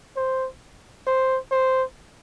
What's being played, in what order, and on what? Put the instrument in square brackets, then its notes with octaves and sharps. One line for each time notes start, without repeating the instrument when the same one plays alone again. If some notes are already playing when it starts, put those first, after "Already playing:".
[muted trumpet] C5
C5
C5